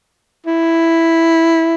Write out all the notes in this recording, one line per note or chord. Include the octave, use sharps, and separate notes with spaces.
E4